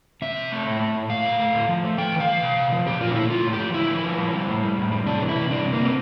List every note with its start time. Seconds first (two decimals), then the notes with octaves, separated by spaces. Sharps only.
0.22 C3 E5
0.36 C3
0.52 A3
0.66 A2
0.80 A3
0.96 A2
1.09 A#2 F5
1.24 A3
1.39 A3
1.54 A2
1.69 F3
1.84 A3
1.98 E3 G5
2.12 A2
2.20 F5
2.27 G3
2.43 C3
2.56 C3
2.72 F3
2.86 A#2 G4
3.00 A#2 F4
3.11 D4
3.15 A3 E4
3.30 A3 F4
3.45 A2
3.53 G4
3.59 F3
3.74 D3 E4
3.89 F3
4.04 F3
4.18 G3
4.33 G3
4.48 A2
4.62 G3
4.78 A2
4.92 G3
5.06 C3 D4
5.21 E3
5.29 E4
5.36 C3
5.50 G3 D4
5.65 C3
5.73 A#3
5.80 C3 C4